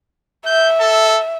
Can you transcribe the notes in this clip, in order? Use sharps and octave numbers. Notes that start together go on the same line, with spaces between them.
E5 G6
A4